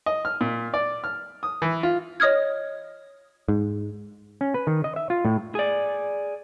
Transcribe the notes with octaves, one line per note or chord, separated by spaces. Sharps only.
D#5
F6
A#2
D5
F6
D#6
E3
F4
C#5 D#5 D#6 F6 G#6
G#2
C#4
B4
D#3
D#5
E5
F4
A2
G#4 D5